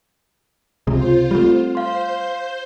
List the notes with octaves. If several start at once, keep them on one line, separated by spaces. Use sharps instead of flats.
C#2 C3 G#3 F4 C5
G3 A3 C4
C5 F5 C6 G6